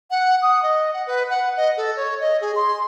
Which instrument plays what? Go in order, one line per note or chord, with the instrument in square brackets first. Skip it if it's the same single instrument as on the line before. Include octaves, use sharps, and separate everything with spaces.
[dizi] F#5
D#6
D#5
F#5
B4
F#5
D#5
A4
C#5
D#5
G#4
C6